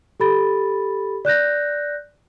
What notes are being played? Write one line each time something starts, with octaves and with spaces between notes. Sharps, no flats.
G4 A4 B5 A6
D5 F#6 G6 A#6